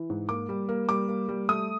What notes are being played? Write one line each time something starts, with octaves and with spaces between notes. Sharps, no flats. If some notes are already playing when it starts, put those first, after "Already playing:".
Already playing: E3
G#2
A#3 D6
G3
A#3
G3 D6
A#3
G3
A3 D#6